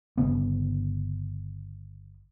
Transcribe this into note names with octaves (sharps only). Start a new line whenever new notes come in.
G1 C#3 B3